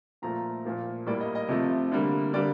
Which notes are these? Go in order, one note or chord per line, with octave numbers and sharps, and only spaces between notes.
A#2 F3 A3 A#5
A#2 F3 A#3
A2 G3 A#3 D5
D#5
D#5
C3 F3 A3 D#5
D3 G3 A#3
D3 G3 A#3 D5